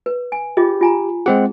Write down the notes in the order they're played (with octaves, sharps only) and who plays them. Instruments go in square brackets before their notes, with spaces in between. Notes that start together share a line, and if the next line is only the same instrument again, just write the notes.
[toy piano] B4
G#5
[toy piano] F4 G#4 D#5 [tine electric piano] G4
[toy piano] F4 G#5 A#5
[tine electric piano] G#3 C4 F#5 [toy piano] G#4